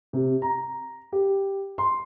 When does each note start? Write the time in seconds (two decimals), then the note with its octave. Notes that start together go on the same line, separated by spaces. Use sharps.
0.13 C3
0.42 A#5
1.12 G4
1.78 C6